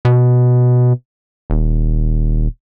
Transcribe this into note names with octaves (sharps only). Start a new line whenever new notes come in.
B2
D#1